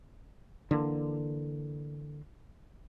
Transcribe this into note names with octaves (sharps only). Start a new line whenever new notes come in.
D3 E3 A#3